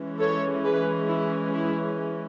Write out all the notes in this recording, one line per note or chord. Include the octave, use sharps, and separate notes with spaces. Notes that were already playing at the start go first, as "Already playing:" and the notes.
Already playing: E3 G#3 C#4
A4 C#5
G#4 B4
E4
E4 G#4